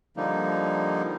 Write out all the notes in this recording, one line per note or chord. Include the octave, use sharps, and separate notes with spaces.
D3 F3 G3 A#3 D#4